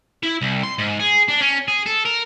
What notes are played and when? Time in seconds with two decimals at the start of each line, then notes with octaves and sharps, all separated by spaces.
0.23 E4
0.42 C2
0.63 C6
0.78 G#2
0.99 G#4
1.28 D4
1.41 C#4
1.68 G#4
1.86 A4
2.05 A#4